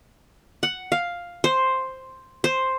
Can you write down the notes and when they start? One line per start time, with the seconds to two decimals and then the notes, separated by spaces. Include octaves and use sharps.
0.63 F#5
0.92 F5
1.44 C5
2.44 C5